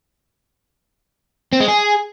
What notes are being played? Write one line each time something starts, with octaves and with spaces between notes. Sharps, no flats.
C4
G#3
G#4